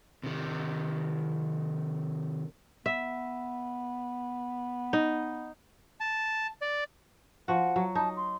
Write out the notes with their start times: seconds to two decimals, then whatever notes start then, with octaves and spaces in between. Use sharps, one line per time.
0.24 C3 D#3
2.86 B3 E5
4.93 D#4
6.00 A5
6.62 D5
7.48 F3 F#4 F#5
7.76 F#3
7.95 D#4 A5
8.17 C6